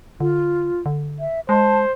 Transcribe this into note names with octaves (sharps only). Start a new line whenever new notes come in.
D3 F4
D3
E5
G#3 C5 A5